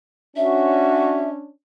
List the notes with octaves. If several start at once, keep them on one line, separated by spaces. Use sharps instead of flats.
C#4 D4 F#4 E5